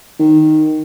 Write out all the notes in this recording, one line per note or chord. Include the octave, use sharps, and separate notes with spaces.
D#3